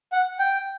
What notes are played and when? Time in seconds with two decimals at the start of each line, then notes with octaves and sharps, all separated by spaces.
0.12 F#5
0.39 G5